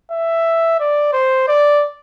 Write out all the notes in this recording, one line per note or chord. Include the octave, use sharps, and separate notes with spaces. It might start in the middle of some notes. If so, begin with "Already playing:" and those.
E5
D5
C5
D5